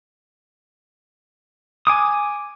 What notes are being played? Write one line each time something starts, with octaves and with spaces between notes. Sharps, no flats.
G#5 D6 D#6